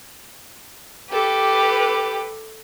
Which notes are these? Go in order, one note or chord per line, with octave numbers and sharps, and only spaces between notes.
G4 A4 B4 D6